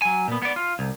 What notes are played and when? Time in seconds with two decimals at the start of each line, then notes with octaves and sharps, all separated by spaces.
0.02 F#3 G#5
0.28 A#2 B3
0.42 B3 D5
0.56 F4
0.79 C2